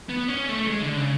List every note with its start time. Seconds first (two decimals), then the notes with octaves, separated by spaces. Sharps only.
0.09 B3
0.28 C#4
0.48 A3
0.67 G#3
0.82 D3
0.97 C#3